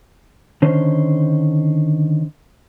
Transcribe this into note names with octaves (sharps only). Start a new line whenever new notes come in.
D3 D#3 C#4 C5